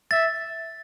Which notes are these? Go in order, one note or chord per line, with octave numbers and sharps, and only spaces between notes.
E5 A6